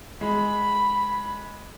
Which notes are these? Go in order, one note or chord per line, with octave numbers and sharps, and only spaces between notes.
G#3 B5